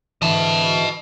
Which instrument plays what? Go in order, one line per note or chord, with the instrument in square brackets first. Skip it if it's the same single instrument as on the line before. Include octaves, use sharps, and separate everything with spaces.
[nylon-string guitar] G#2 D3 E3 [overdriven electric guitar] D#5 A5